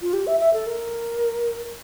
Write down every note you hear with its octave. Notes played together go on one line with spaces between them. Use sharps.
F4
G4
E5
E5
A4
A#4